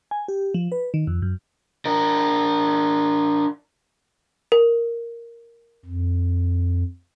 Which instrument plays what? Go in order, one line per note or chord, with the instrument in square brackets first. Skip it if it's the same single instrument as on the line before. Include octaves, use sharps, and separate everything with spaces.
[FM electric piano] G#5
G4
F3
B4
D#3
F2
F#2
[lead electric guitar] D4 A#4
[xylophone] A#4
[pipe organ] F2